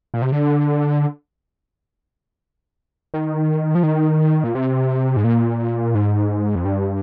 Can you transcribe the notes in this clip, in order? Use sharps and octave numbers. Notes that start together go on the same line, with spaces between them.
A#2
C3
D3
D#3
F3
D#3
A#2
C3
G#2
A#2
G#2
F2
G2